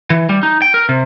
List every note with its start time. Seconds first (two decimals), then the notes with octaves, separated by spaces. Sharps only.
0.10 E3
0.29 G3
0.43 D#4
0.62 G5
0.74 A#4
0.89 C3